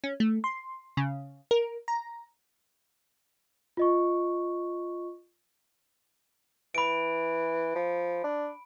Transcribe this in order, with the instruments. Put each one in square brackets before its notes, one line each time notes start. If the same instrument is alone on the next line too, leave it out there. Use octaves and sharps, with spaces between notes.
[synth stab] C#4
A3
C6
C#3
A#4
A#5
[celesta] F4 D#5 C#6
[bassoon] E3 [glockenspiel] B5 D7
[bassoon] F3
D4